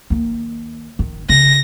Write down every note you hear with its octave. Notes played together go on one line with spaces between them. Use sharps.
D#3 A#3
D#3
C#3 A#6